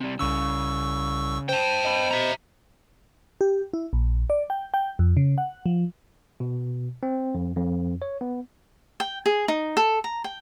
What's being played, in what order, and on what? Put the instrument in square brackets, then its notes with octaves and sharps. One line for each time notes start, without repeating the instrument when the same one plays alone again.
[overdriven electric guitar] C3 G3
[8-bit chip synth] C2 C#6 E6 [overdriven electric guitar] C#3
[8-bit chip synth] C5 [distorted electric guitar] G5 A5
[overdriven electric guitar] D#5 B5
[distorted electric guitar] E5 A#5
[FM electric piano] G4
E4
A#1
D5
G5
G5
F2
C#3
F#5
F3
[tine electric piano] B2
C4
F2
F2
C#5
B3
[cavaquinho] G5
G#4
D#4
A4
A#5
G5